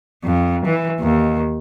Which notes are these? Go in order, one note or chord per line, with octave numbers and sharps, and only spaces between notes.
F2
E3
D#2